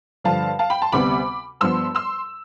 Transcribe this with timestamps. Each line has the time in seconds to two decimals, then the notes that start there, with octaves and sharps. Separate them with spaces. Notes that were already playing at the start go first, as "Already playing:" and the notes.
0.24 G2 D3 F3 F5 A5
0.59 F5 A5
0.70 G5 B5
0.82 A5 C6
0.92 D2 C3 G3 B3 B5 D6
1.61 G2 F3 B3 C6 E6
1.95 C6 E6